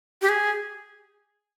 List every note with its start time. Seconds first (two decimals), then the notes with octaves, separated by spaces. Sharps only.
0.22 G4
0.29 G#4